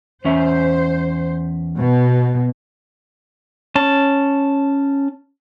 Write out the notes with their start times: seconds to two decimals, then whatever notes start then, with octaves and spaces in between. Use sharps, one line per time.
0.25 E2 C#4 C5 E5
1.76 B2
3.76 C#4 A5